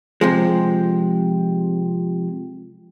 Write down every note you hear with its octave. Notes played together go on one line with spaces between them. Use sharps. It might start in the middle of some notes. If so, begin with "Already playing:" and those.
C3 F3 G#3